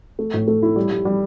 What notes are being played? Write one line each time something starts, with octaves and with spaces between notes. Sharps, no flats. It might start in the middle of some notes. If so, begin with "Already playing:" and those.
A3
A2
A3
E4
G3
G3
G3